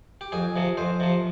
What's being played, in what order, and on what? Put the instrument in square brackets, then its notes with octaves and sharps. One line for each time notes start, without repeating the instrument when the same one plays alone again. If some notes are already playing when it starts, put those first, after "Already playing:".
[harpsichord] G4
F2 G#4
C3 F3
F2 C5
C3 F3